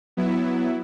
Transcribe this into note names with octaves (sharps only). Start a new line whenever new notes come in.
F#3 B3 E4